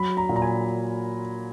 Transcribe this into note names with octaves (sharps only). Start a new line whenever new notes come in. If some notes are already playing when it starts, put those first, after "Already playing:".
Already playing: F#3 B5
A#5
A#2
A#5
G#5